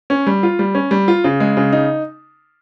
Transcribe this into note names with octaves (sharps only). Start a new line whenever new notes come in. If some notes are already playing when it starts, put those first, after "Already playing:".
C#4
G3
F4
G3
C#4
G3
F4
C#3
G#3
C#3
D#4